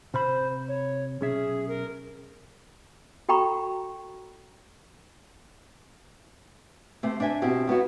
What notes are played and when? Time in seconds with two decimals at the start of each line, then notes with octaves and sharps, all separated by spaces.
0.14 C3 C5 B5
0.68 C#5
1.21 B1 C#4 G#4 E5
1.68 A#4
3.29 F#4 A4 G5 A#5 B5 C#6
7.03 C3 A3 C4
7.20 D4 C5 E5 G#5
7.42 B2 C4 E4 G4
7.67 F#3 B3 E4 F#4